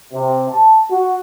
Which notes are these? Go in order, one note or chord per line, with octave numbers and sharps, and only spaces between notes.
C3
A5
F#4